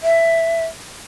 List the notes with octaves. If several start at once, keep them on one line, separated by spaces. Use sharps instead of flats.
E5